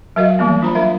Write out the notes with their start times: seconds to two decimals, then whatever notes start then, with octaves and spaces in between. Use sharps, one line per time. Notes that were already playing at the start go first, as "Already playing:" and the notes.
0.16 F#3 F#4 A#4 D#5 F5
0.39 E3 F3 G3 A#3 B3
0.62 D4 F4 C5 A#5 B5
0.75 F#3 D4 A#4 E5 F5